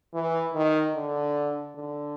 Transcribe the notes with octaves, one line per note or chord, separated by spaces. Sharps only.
E3
D#3
D3
D3